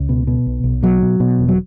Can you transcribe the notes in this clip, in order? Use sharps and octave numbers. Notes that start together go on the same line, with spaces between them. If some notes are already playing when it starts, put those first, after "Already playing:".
Already playing: C#2
B2
B2
B1
B1
B2 F#3
B2
B2
E1
F#3